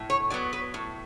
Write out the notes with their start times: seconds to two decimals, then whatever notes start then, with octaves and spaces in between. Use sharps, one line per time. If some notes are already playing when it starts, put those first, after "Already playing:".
Already playing: A2
0.10 C#5
0.30 F#3 B3 D5
0.53 B4
0.74 A2